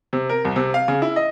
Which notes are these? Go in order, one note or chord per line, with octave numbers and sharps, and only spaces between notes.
C3
A#4
C2
C3
F5
C#3
E4
D#5